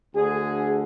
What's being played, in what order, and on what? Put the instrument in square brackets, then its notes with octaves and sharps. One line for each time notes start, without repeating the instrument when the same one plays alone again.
[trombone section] D2 D3 G#4